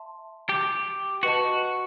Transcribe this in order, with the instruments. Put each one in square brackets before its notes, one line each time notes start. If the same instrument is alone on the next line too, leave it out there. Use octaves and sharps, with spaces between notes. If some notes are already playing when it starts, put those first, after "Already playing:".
Already playing: [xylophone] E5 A5 C6
[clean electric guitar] G4
[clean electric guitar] F#4 [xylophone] B4 D#5 A5